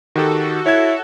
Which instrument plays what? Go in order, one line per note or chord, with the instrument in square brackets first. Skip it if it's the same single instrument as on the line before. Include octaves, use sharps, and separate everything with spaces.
[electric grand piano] D#3 G4 [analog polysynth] F#4 A4
[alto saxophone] E4 [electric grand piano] C#5 G#6